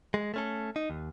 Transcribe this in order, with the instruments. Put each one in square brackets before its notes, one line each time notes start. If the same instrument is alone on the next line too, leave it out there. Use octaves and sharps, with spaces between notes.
[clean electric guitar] G#3
A3 C#4 A4
D#4
D#2